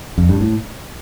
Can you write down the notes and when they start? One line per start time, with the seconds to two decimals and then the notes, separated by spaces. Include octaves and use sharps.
0.18 F2
0.29 G2
0.41 A2